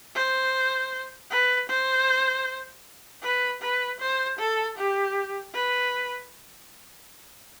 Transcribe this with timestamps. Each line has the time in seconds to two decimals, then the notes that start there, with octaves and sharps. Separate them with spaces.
0.15 C5
1.30 B4
1.69 C5
3.23 B4
3.62 B4
4.00 C5
4.39 A4
4.78 G4
5.54 B4